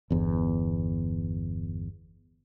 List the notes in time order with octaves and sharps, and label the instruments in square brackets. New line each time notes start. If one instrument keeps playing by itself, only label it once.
[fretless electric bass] G1 E2